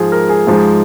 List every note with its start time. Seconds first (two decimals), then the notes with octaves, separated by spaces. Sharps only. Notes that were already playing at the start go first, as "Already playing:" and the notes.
Already playing: G#2 F3 G#3 G#4
0.12 A#4
0.29 G#4
0.47 G#2 F3 G#3